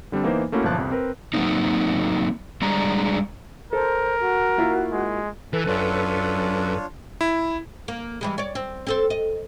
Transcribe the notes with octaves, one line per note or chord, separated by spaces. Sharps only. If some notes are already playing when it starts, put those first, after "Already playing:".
D3 G3 C4 D4
E3 A#3 B3 D#4 B4 C5
A3 A#3 C#4 E4 F#4
G1 A#2 E3 F3 A5 F#6
C2 F2
C4 A#4 B4
F#3 A3 A#3 C4 D#4
G3 G#3 D4 A#5
A4 A#4 C5
F#4
A#3 E4 F4
G#3
E3 A4 B4
F#2 D4 F4 C#5
E4
A#3
E3 G3 G#3
C#5 D5
C4
C4 A4 C5
D#5